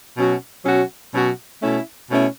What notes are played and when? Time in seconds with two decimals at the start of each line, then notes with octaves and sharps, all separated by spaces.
0.17 B2 F#3 C#4 F#4
0.65 B2 F#3 C#4 F#4
1.14 B2 F#3 C#4 F#4
1.62 B2 A3 C#4 E4
2.09 B2 A3 C#4 E4